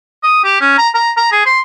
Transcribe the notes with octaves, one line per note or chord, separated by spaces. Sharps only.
D#6
G4
C#4
A#5
A#5
A#5
G#4
C6